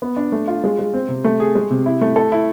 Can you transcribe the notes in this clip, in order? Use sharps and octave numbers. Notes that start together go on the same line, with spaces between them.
B3
D4
A3
F4
G#3
G#3
C4
C3
A3
G#4
G#3
C3
E4
A3
A4
E4